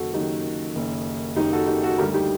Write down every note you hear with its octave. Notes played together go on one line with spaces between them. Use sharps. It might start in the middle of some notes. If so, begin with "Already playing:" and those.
Already playing: F#1 F#2 D#3 F#4 A4
F#1 F#2 D#3 D#4 G4
F#1 F#2 D#3
F#1 F#2 D#3 D#4 G4
F#4 A4
D#4 G4
F#4 A4
D2 D3 G3 G4 A#4
D#4 G4